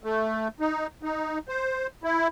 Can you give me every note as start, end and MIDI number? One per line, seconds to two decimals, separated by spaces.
0.04 0.48 57
0.60 0.87 63
1.03 1.38 63
1.48 1.87 72
2.04 2.28 64